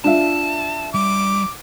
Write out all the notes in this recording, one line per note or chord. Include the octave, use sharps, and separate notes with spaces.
D4 F4 E5 A5
G3 D6